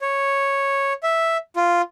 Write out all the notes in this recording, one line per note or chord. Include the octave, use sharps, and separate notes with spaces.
C#5
E5
F4